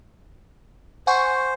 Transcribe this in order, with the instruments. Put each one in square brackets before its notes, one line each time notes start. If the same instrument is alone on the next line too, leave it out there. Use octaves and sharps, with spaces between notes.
[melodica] C5 [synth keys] F#5 G#5 C#6